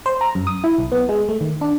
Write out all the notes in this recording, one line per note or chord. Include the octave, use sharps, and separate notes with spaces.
C5
A#5
F#2
D#6
E4
B1
B3
G#3
A3
D#3
D4